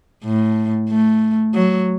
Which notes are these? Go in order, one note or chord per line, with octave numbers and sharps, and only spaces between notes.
A2
A3
F#3